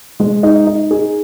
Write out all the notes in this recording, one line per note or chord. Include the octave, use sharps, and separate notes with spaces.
G#3
D#4
D#4
G#4